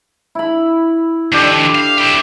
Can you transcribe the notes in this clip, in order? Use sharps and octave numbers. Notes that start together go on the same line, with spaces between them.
E4 B5
D#3 F3 D4 G4 A4
F5
E4 G4